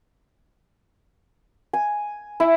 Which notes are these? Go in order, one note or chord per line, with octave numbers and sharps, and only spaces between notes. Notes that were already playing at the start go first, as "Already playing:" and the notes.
G#5
E4